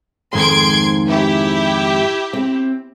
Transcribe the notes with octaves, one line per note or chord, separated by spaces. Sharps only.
F2 G#2 D#3 C6 G#6 D7
E4 G4
C4